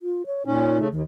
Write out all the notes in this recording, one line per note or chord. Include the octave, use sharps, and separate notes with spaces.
F4
C#5
A#2 C#4 D#4
C#3 A3
D#2 D#3